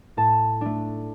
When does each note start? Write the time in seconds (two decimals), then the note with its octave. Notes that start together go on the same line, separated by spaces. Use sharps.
0.17 A2 A5
0.61 A3 D4